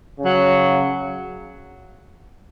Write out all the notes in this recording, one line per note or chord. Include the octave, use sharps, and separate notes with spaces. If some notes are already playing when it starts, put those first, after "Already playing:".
C#3 F#3